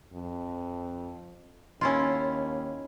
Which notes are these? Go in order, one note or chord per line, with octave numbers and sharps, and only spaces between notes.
F2
D#2 C#4 E4 F4